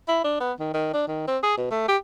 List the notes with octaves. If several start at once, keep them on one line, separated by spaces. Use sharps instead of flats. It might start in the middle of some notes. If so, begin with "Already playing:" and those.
E4
D4
B3
D#3
D#3
D4
D#3
C4
G#4
B2
A3
G4